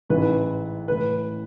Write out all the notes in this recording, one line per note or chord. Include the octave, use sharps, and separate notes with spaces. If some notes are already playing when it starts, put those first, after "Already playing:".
A1 G#2 E3 B4
A2 E3 B4